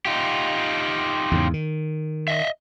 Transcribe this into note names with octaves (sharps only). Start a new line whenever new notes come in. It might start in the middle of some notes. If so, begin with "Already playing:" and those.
D#4 F4 G4
E2 G#2 C#3
D#3
D#5 E5